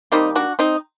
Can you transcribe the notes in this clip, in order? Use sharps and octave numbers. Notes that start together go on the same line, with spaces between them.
D#3 G3 A#3 C4 D#4
D4 F#4
C4 D#4